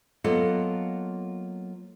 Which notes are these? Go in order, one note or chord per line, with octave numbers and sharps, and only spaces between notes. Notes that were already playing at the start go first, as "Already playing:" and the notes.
F#3 A#3 B3 F4 A4 D#5